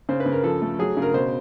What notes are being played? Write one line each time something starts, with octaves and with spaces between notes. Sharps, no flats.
C#3 C5
B4
C#3
A#4
F3 A4
A3
F#3 G#4
C#3
A#4
B2 C5